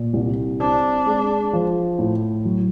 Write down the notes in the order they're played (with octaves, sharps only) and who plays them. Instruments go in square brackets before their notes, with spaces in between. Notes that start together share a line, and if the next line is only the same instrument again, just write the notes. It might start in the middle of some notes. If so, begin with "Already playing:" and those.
Already playing: [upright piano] A#2
C2
[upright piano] C4 [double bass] D4
[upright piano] G#3
F3
A2
F#3